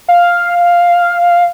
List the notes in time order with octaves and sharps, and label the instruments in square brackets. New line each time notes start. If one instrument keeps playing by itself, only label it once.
[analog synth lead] F5